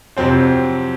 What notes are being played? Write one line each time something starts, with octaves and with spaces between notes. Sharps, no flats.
F2 C3 F#3 C4 C5